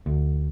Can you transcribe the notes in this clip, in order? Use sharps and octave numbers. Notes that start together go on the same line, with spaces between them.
D2